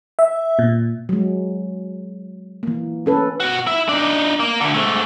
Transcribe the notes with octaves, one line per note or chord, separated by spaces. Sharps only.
E5
A#2
F#3 G#3
E3 A#3
C#4 A4 B4
B2 F#4
E4 E5
D4 D#4
A#3
D2 D3
G#2 A3